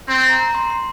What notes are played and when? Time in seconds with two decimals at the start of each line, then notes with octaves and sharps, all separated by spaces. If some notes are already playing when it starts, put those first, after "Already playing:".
0.08 C4 C6
0.29 A#5
0.39 A#5
0.55 C6
0.70 C6